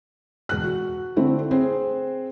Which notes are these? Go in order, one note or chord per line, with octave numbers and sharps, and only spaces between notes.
E1 F#6
F#4
D3 A3 C4 E4
C4 G#4 C5